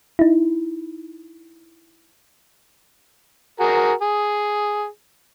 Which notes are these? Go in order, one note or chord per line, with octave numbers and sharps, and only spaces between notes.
D#4 E4
F#4 G#4 A#4
G#4